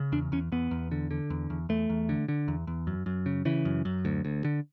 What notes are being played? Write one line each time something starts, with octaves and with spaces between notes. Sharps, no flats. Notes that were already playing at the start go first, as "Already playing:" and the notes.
Already playing: C#3
E2 D4
E2 C#4
E2 B3
E2
D3
D3
E2
E2
E2 A3
E2
D3
D3
E2
E2
F#2
F#2
C#3
C#3 E3
F#2
F#2
D2
D2
D3